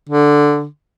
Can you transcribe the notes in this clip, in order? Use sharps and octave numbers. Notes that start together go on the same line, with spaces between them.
D3